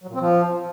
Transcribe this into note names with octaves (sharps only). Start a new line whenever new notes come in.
F#3
A#2
C4
F3